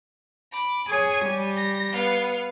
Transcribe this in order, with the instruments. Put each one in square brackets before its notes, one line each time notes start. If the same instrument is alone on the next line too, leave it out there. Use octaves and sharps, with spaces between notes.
[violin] B5 D6
[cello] G#4 C#5 [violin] G#5
[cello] G3
[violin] A#6
B3 F5